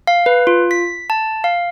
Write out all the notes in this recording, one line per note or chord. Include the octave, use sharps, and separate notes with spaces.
F5
B4
F4
B6
A5
F5